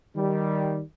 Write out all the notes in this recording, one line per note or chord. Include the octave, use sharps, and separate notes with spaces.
D#3 G3